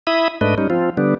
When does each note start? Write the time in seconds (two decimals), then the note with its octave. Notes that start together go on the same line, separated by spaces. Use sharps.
0.07 E4 E5 B5 D#6
0.41 G#2 A3 D4 B4 D#5
0.58 G3 C#4 D#4
0.70 F3 C4 F4
0.97 D3 G3 B3 D4